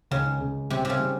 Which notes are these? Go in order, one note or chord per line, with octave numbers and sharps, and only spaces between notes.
C#2 C#3
C#2
C3 G3
C3
C#3
G3